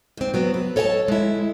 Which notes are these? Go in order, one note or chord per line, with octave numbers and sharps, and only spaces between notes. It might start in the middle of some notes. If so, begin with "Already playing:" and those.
G#2 C4
F#3 B3 C4
B4
A4 C#5 D#5 F#5 A5
G#3 E4